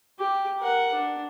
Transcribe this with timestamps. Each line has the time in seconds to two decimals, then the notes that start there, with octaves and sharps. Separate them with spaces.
0.19 G4
0.59 A#4 F#5
0.93 D4